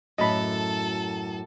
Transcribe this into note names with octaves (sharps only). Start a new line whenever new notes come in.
F#2 A2 F#3 A4 D#5 A5 B5